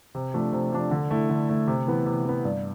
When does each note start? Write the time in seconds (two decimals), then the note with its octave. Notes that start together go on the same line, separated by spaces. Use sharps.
0.15 C3
0.34 F3 A3 D4
0.53 C3
0.72 F3 A3 D4
0.91 D3
1.11 A3 E4
1.29 D3
1.49 A3 E4
1.67 C3
1.87 E3 B3
2.06 C3
2.25 E3 B3
2.44 G2